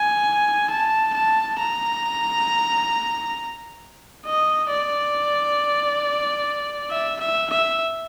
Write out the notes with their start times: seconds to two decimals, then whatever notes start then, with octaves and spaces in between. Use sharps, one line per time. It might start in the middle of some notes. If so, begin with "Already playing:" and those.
Already playing: G#5
0.70 A5
1.15 A5
1.60 A#5
4.26 D#5
4.70 D5
6.91 E5
7.20 E5
7.50 E5